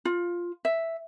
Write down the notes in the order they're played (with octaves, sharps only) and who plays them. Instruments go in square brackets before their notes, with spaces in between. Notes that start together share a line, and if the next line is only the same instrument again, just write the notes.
[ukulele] F4
E5